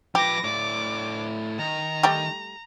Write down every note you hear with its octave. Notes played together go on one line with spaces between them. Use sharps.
F3 G4 B4 D6 A#6
A2 D5 D6
D#3 A#5
G3 A3 G4